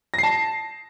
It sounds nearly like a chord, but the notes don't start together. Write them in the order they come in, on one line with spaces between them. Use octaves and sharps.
A#6 C7 A5